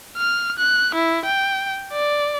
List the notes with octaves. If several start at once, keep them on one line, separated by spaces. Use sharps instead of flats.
F6
F#6
E4
G5
D5